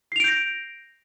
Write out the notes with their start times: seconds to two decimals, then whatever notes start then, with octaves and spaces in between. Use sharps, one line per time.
0.12 C7
0.16 F7
0.20 D7
0.24 G6
0.28 A#6